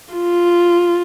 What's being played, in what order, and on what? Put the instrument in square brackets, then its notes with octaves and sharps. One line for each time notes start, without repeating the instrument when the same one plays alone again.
[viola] F4